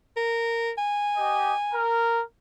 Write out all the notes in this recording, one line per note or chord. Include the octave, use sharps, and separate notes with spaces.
A#4
G#5
G4 D#5
A#4